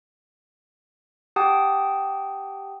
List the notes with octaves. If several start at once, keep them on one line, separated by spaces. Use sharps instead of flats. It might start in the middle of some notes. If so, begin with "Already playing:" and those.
G4 F#5 G5 A5 D#6